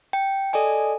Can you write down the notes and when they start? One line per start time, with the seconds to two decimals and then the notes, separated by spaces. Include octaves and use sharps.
0.13 G5
0.53 A4 D5 D#5 G#5